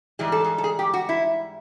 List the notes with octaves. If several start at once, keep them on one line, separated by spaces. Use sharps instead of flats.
G#2 E3 G3 G#4
A4
G#4
A4
G#4
G4
F#4
E4